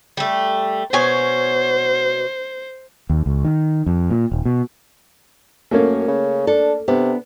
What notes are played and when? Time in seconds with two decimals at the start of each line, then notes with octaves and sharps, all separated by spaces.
0.17 G3 A3
0.93 B2 C5 C#5 G#5
3.10 D#2
3.26 C#2
3.45 D#3
3.86 F2
4.10 A#2
4.32 D#1
4.45 B2
5.71 F#2 A3 A#3 C#4
6.08 C#3
6.47 D4 A4
6.88 C3 B3 D4